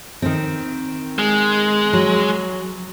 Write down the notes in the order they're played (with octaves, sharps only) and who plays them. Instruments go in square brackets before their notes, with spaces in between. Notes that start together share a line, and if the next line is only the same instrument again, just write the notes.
[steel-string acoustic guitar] D#3 C4
[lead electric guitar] G#3
[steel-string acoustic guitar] F#3